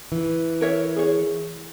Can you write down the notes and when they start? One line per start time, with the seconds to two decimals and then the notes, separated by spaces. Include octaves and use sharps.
0.12 E3
0.61 A#4 C#5 E5
0.96 G#4 C#5